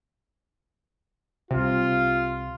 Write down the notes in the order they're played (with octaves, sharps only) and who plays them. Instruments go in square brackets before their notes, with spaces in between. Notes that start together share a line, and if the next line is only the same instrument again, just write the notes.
[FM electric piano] C2 C3 [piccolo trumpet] F4